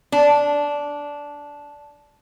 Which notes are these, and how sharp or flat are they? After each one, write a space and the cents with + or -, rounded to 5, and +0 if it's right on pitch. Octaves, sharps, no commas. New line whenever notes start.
D4 -10